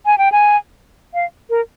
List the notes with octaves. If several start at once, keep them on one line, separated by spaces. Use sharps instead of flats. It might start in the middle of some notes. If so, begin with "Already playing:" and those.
G#5
G5
G#5
F5
A#4